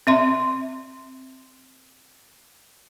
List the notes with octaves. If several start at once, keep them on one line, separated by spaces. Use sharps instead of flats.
C4 E5 C6